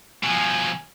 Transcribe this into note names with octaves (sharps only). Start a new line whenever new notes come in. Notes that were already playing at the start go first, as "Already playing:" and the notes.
B2 F3 G#5